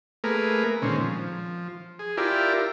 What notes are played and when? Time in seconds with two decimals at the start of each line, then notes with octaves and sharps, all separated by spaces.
0.24 A3 A#3 G#4 A#4 B4
0.82 A#2 D3 D#3 G#3 C4 C#4
1.01 F3
1.99 G#4
2.17 E4 F4 G4 A#4 D5